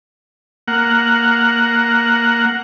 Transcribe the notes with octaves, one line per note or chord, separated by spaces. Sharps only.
A#3 F#5